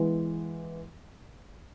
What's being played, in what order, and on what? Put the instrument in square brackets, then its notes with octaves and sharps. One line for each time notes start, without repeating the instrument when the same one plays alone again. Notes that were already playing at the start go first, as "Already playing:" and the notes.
Already playing: [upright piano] E3 G#3 B3